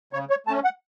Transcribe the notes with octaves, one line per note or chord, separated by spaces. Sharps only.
C#3 C#5
C#5
A3 C#4 A5
F#5